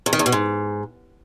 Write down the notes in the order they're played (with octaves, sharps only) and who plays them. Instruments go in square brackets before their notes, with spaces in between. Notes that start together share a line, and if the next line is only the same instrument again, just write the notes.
[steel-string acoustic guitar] E2
D#3
E2
B2
G#2